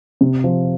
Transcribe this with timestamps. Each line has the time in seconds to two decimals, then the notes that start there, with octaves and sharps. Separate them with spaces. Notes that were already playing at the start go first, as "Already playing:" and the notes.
0.21 C3
0.44 F3